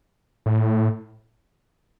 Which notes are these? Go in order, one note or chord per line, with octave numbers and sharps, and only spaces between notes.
A2